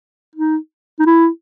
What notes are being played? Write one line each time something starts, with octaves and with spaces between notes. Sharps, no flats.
D#4
D#4
E4